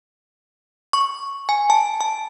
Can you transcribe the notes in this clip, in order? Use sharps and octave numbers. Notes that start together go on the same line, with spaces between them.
C#6
G#5
A5
A5